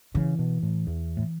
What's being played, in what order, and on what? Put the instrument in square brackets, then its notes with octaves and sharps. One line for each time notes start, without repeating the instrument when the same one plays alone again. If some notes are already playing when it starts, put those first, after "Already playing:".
[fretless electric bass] C#3 [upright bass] E3
[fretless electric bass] B2
A2
E2
A2